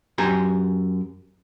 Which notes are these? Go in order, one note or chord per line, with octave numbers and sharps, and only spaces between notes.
F#2 G4 G#5 A#5